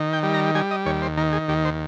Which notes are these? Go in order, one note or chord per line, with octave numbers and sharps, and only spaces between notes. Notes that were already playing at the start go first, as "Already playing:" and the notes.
Already playing: D#3
G5
G3
A#5
G3 G#5
D#5
D#2 C#5
C5
D#3 A#4
G#4
D#2 G4
C5